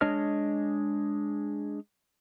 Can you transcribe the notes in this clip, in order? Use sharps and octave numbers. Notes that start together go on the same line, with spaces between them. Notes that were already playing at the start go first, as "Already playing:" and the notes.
G#3 D4 C#5 D#5 F6